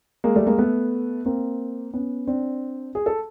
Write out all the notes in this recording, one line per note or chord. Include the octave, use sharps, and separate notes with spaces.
G#3 A#3
G3 A3
G#3 A#3
A3 B3
A#3 C4
B3 C#4
C4 D4
G#4
A4